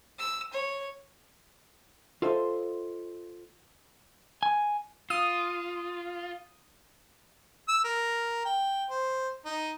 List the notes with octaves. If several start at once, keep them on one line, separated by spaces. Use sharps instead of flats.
E6
C#5
F4 A4 C5 D#5 E5
G#5
F4 D#6
E6
A#4
G5
C5
D#4